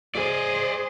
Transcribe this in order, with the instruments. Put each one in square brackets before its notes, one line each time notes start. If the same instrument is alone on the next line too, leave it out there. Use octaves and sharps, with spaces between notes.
[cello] G#4 C5 [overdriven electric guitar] D5 D#5